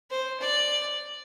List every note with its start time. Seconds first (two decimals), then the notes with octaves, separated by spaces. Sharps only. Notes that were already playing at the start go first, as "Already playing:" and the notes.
0.10 C5
0.41 D5